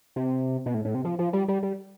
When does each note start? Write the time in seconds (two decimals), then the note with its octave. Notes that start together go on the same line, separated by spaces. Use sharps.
0.16 C3
0.66 B2
0.74 A2
0.85 A2
0.95 C3
1.05 F3
1.19 F3
1.33 G3
1.48 G3
1.63 G3